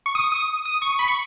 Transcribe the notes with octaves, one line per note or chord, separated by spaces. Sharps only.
C#6
D#6
D#6
D#6
C#6
B5
C#6